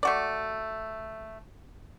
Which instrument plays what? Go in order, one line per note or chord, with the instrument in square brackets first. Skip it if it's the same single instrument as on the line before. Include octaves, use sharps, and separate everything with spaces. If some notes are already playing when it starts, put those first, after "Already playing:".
[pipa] A3 F#4 D5